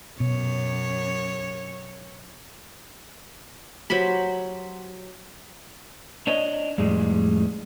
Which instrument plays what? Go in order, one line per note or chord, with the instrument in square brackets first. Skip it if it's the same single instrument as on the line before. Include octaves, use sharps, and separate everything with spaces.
[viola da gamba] F#2 C#5 [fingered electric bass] B2
[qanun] F#3 G4 C5 B5
[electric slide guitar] D4 C#5 D#5
F2 A2 G3 G#3